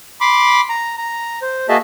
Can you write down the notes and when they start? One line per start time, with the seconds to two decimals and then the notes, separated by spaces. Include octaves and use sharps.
0.21 B5 C6 D6
0.69 A#5
0.98 A#5
1.42 C5
1.69 A#3 F#4 G#4 D#5 E5 A5